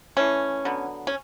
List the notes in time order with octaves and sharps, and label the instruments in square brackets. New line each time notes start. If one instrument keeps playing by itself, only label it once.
[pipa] E3 A3 C#4
D3 F#3 B3
C#4